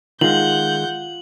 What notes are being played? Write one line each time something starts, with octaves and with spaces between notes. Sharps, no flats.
D#3 G#3 F4 F#5 G6 F#7